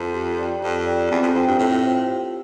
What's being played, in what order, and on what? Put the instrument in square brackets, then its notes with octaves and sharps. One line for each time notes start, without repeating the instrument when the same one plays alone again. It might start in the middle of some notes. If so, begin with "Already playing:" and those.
Already playing: [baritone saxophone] F2
[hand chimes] G4
D5 G5
[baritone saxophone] F2 [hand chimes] G4
[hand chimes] D5 G5
[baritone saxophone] E2 [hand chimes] C4
[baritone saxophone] F2
[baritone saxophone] F2 [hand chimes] F4 C5 G5
[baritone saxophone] G2
[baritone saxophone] A2 [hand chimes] C4
[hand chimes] F4 C5 G5
G4